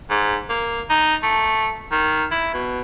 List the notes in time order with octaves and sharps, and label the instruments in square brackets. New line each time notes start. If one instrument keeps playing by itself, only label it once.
[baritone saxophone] G#2
A#3
D#4
A3
D#3
E4
B2